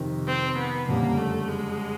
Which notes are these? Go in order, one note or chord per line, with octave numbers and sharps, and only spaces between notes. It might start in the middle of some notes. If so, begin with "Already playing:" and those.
Already playing: F2 C3 D#3
C4
B3
F#1 F2 D3 G3 A#3
A3
G#3